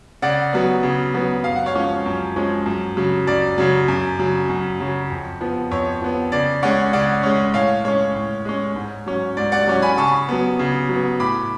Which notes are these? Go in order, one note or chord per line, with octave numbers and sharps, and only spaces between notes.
C#3 D5 F#5
F#3 B3
C#3
F#3 B3
F#2 F5
F#5
C#5 F5
F3 G#3 C#4
F#2
F3 G#3 C#4
F#2
C#3 F#3
F#2 D5
C#3 F#3
F#2
C#3 F#3
F#2
C#3 F#3
F2
F3 B3
F2 C#5
F3 B3
C#3 D5
G#3 C#4 D5 F#5
C#3 D5 F#5
G#3 C#4
A2 C#5 F5
G#3 C#4 C#5
A2
G#3 C#4
G#2
F#3 C#4
G#2 D5
D5 F#5
F#3 C#4
G#5 B5
C#3 A5 C#6
F#3 B3
C#3
F#3 B3
A2 B5 D6